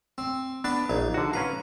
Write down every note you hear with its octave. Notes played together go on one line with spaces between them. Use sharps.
C4
B3 D4 B4 A5
A#1 D#4
D3 F#4
C#4 B4 F5 A#5